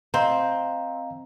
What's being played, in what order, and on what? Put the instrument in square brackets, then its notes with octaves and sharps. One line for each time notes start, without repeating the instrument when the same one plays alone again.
[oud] C4 [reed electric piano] D#5 F5 A#5